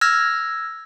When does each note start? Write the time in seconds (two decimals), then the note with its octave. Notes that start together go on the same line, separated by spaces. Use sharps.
0.01 E6 F6 G#6 A#6